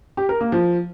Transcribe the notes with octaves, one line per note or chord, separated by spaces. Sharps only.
G4
A#4
A#3
F3